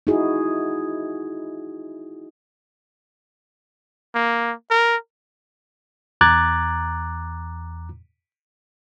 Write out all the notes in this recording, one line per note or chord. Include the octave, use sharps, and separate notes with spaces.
D#4 E4 F#4 G#4
A#3
A#4
E2 A#5 D6 F#6 G#6 A6